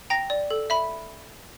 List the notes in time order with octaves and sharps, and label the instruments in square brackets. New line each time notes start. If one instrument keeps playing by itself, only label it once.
[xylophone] G5 A#5 A#6
D5
A4
E5 B5 B6